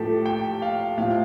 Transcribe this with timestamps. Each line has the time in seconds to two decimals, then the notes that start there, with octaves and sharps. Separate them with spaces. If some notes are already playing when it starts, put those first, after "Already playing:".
Already playing: A2 F3 G4 A4
0.26 G5
0.62 F5
0.98 A2 F3 F5